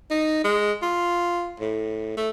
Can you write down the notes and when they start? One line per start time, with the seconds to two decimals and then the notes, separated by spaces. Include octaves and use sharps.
0.11 D#4
0.44 G#3
0.82 F4
1.60 A2
2.17 A3